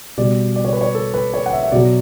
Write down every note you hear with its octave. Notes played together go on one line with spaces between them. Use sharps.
B2 G3 D5
D5
C#5
B4
C#5
A4
B4
C#5
F#5
E5
E5
B2 F#3 D5